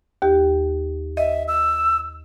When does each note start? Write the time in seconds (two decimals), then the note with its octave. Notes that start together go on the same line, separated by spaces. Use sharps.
0.22 D#2 G4
1.17 D#5 E5
1.48 E6